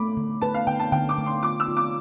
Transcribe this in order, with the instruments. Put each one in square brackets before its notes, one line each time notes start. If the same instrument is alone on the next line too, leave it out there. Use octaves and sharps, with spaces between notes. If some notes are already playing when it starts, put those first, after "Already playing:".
Already playing: [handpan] A3 [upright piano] B5 D6
[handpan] D3
[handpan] B4 [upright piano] A5
[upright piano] F5
[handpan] D3 [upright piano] G5
[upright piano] A5
[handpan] D3 [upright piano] G5
[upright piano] D6
[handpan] A3
[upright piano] C6
[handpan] F4 [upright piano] D6
[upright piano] E6
[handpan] F4
[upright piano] D6